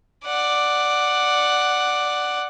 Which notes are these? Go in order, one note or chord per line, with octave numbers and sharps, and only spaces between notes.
D5 F#5